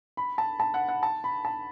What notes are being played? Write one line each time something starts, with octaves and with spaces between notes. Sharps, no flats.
B5
A5
A5
F#5
F#5
A5
B5
A5